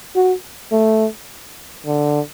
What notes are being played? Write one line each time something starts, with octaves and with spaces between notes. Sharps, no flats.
F#4
A3
D3